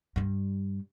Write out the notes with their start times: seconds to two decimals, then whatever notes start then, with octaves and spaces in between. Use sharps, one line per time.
0.16 G2 G3